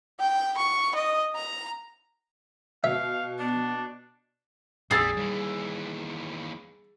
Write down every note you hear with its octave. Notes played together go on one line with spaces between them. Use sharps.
G5
C#6
D#5
A#5
B2 E5 F5
B3 D4
A#1 F2 A#2 G3 G#4 E6 A6 C7
D#2 E3 G3